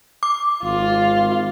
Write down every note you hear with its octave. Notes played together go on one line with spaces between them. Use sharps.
D6
G#1 F4